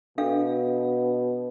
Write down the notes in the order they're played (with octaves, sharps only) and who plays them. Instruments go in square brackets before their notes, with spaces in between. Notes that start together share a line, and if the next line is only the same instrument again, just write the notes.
[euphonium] B2 [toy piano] D4 A4 F5